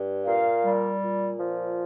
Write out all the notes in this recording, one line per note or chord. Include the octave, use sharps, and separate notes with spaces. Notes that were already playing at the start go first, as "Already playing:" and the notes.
Already playing: G2
A#2 F5
G3
A#2
F3